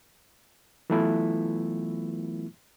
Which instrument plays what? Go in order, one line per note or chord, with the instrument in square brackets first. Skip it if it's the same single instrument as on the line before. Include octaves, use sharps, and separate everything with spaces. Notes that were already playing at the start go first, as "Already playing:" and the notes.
[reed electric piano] E3 F#3 A3 B3 E4 F4